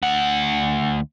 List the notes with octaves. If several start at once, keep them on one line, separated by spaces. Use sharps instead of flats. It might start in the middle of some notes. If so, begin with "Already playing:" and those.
D2 F#5